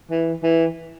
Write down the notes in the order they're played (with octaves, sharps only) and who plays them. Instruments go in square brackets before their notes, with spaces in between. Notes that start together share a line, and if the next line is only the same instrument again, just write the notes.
[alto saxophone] E3
E3